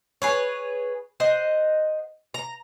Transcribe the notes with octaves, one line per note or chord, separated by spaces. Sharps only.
G#4 B4 C#5
C5 D#5 F#5
A#5